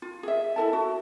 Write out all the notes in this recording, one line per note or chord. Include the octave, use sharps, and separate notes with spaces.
F4
G#4 E5
E4 A4 A5
F#4